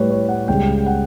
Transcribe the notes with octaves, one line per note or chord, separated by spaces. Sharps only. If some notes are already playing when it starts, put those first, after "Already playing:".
Already playing: A2 G3 B4 C#5
C#5
F#5
C#2 C#3 G3 G5
F#5